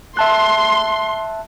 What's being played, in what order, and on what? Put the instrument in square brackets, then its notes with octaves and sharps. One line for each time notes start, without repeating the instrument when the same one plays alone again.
[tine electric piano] E5 A5 F#6 [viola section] C6